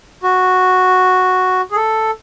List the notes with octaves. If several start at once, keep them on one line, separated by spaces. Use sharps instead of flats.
F#4
G#4
A4